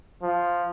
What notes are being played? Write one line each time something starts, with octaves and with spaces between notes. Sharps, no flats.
F3